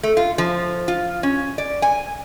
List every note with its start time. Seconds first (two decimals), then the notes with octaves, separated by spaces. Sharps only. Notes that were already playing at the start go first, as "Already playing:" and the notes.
0.03 A3
0.17 F4
0.38 F3
0.88 F4
1.23 C#4
1.58 D5
1.82 G#5